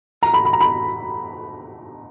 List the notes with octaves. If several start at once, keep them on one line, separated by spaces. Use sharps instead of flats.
A#5
B5
B5
A#5
B5